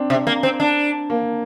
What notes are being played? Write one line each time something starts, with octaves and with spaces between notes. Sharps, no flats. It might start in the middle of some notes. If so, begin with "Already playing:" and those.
Already playing: C4 D4
C3
A#3
C4
D4
A#3